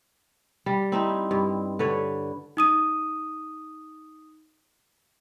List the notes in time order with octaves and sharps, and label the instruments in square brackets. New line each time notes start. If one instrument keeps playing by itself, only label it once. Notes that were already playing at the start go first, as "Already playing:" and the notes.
[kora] G3
C4 D#4 E4
G2
D3 B4 C#5
[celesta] D#4 D#6 D#7